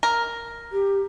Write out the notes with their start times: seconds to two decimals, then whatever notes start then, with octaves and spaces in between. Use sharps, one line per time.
0.03 A#4
0.72 G4